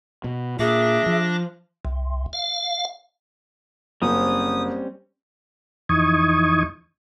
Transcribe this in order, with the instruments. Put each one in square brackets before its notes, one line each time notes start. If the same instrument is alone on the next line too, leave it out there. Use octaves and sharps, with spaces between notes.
[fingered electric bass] B2
[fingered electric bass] A#2 [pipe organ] D4 D6 A#6 [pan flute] G#4 [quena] E5
[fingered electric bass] F3
[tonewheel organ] C2
F5
[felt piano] F#1 [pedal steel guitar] G3 C4 C#4 [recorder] D#6
[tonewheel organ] F2 E3 D#4 C#6 D#6 G#6